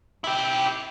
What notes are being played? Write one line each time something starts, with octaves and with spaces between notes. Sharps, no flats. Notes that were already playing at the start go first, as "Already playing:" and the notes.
E4 G4